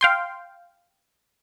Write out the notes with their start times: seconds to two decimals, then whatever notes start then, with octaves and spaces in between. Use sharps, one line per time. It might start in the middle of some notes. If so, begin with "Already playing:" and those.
0.01 F5 G5 C6